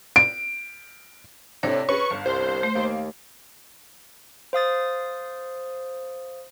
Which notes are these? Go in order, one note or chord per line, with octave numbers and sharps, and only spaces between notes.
D7
A2 C3 D4 C#5 A#6
C#4 G#4 B4 C#6
G1 F5
C2 C5
A3
D#2 A#3
C5 F5 D#6 A6